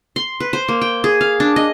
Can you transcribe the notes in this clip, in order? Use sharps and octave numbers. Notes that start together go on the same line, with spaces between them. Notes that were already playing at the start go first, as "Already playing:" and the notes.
C6
B4
C5
A#3
G5
G#4
F5
D4
D#5